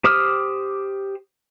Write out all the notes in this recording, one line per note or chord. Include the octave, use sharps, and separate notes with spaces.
G4 C5 D6 D#6 F6